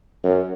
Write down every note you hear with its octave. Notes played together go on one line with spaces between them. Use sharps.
F#2